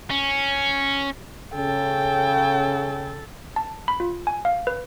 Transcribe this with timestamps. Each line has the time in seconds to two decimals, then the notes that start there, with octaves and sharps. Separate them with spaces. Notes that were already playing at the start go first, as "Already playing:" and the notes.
0.10 C#4
1.55 C#3 A4 G5
3.56 A5
3.88 B5
4.00 F4
4.27 G#5
4.45 F5
4.67 B4